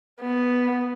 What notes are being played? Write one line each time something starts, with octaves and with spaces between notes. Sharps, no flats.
B3